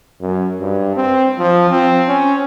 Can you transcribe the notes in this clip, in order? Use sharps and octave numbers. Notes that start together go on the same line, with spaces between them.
F#2
G2
C4
F3
C4
C#4